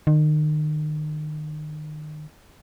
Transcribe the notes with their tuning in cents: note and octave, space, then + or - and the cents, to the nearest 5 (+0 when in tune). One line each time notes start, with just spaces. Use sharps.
D#3 -35